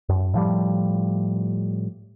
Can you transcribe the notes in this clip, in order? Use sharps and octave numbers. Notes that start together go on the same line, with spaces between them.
F#2
A2 F3 G3